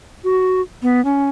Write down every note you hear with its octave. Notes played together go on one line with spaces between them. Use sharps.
F#4
B3
C#4